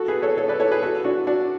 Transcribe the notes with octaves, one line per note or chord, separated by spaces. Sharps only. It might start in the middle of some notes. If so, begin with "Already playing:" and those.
Already playing: F#4 A4
G#4 B4
A4 C#5
A4 C#5
B4 D5
A4 C#5
G#4 B4
F#4 A4
D4 F#4
D4 F#4